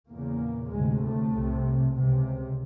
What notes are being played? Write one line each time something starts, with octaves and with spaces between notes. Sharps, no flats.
E2 A#2 C#3 A#3
D2 G#2 C3 G#3
A2 A3
C2 C3
C#2 C3